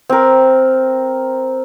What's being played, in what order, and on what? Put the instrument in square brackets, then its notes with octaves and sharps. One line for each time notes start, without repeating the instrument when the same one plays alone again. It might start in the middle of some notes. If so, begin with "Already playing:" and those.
[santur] C4 A#4